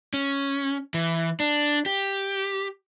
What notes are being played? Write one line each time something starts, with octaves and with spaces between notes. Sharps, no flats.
C#4
E3
D4
G4